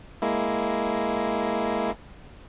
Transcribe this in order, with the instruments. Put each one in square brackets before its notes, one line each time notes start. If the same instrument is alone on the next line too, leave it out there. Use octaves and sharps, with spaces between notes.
[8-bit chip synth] G#3 A#3 E4